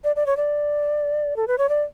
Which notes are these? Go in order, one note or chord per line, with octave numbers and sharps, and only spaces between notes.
D5
D5
C#5
D5
A4
B4
C#5
D5